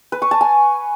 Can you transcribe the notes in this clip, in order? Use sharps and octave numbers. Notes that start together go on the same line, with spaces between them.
B4
C#6
A5
G#5